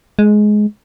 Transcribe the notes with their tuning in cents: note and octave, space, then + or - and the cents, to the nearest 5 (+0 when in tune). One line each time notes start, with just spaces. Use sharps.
G#3 +15